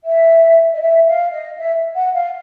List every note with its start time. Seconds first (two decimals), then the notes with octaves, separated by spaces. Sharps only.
0.04 E5
0.73 D#5
0.80 E5
1.06 F5
1.32 D#5
1.57 E5
1.95 F#5
2.14 F5